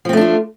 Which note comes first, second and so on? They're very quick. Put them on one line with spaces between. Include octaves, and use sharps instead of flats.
F3 C4 A3 D4 F4